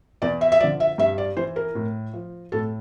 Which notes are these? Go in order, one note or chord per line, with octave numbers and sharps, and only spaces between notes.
E2 D5
E5
E5
D3 F3 D5
E5
G2 E5
D5
E3 C5
A#4
A2
F3
A2 A4